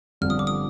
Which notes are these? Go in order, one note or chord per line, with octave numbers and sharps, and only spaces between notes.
G1 G2 D3 F3 C4 F6
D#6
D6
D#6